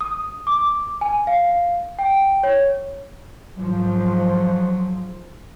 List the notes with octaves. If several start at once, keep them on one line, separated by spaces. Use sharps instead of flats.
D#6
D6
G#5
F5
G5
C#5
G#2 F3 F#3